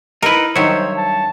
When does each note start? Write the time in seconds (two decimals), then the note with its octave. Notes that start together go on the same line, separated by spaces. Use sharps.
0.22 D#4 E4 A#4 B4
0.56 G2 D#3 F#3 C5 C#5 E5
0.97 A5